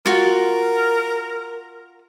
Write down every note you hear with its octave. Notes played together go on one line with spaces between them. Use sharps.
F4 F#4 A#4